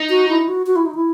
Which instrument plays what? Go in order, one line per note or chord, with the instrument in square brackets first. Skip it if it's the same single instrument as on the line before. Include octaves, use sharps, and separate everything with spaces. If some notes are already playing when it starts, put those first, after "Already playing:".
Already playing: [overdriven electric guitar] D#4
[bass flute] F#4
E4
F#4
F#4
E4
D#4
E4